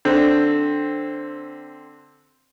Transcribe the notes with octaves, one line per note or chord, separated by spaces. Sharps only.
D3 C4